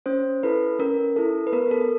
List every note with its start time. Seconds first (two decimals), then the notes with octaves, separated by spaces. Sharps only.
0.06 C#4 C5
0.43 E4 A4 B4
0.79 C#4 A#4
1.16 E4 A4
1.47 B4
1.52 B3 A#4
1.71 A4
1.82 A4